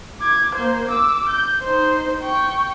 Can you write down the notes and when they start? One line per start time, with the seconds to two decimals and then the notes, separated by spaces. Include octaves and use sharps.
0.21 D6 G#6
0.55 A#3 C5
0.89 D6 E6
1.29 G6
1.63 D#4 C5
2.23 G5 C#6